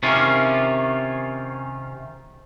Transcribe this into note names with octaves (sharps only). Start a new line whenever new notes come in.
C3 D#3 C#4 F4